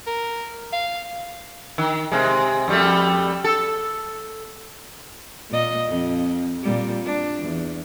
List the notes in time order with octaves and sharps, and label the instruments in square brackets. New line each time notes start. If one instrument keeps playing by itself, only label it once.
[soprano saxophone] A#4
F5
[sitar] D#3
C3 G#3
F2 G3 A3
A4
[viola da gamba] A#2 D#5
F2
A#2 G3
D4
E2